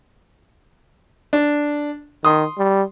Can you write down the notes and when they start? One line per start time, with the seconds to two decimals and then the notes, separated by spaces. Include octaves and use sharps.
1.33 D4
2.25 D#3 C6 D#6
2.58 G3